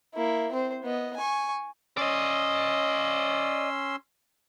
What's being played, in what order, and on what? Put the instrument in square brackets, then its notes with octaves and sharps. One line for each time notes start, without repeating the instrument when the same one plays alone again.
[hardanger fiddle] A#3 E4
C4 C5
B3 D#5
G#5 C#6
[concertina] C#4 C6 E6 [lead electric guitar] D5 D#5